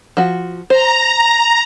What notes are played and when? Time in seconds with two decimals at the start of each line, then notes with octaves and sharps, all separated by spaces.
0.17 F3 F#4
0.70 C5 A#5